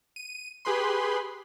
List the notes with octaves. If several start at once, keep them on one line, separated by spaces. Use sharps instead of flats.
D#7
G4 G#4 B4 B5 C6